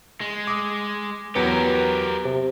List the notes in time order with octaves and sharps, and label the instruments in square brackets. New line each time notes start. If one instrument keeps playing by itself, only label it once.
[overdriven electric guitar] G#3
[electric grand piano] D6 D#6
[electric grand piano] E2 F#3 C#7 [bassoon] B3 [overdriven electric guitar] G4 A#4
[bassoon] C3